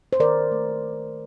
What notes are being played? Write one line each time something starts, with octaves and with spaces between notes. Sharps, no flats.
C5
D#3 A#4 D5
A3